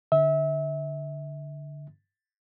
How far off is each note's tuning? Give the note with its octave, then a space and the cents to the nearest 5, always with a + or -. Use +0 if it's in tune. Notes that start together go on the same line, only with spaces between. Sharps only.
D3 +0 E5 -30